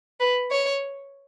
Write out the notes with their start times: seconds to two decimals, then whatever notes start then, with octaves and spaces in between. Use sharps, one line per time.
0.20 B4
0.51 C#5